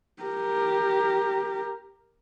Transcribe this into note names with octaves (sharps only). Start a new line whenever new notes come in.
G4 A#4